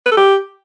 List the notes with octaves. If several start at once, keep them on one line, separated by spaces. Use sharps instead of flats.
B4
A4
G4